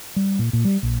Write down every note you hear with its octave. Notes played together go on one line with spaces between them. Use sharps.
G3
A#2
A#2
G3
A#1